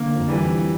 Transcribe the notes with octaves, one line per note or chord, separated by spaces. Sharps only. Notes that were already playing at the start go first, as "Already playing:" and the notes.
Already playing: D3 A#3
F2
E3 G3
C4